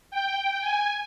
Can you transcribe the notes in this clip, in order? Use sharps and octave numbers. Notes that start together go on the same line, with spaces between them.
G5
G#5